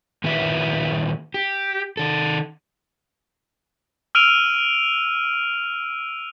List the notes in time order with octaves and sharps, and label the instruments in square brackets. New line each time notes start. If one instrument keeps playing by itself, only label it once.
[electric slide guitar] A#2 D#3 E4 G4 B4 E5
G4
D#3 A4
[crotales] E6 F6 D7 D#7 F7